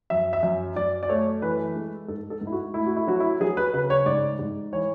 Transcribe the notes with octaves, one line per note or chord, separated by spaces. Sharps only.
F#2 E5
E5
F#2
F#2 D5
D5
A3 C#5
E3 B4
G#3
G#2 A4
A4
G#2
E4
F#4
A3 E4
F#4
E4
F#3 F#4
E4
F#3 G#4
B4
C#3 B4
C#5
G#2 D5
G#2
E3 C#5